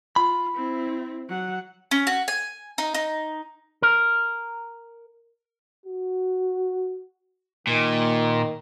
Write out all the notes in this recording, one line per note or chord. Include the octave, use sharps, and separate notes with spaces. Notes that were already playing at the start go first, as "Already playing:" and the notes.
F4 B5
C4 E4
F#3 F#5
C#4
F#4
G#5
D#4
D#4
A#4
F#4
A#2 D#3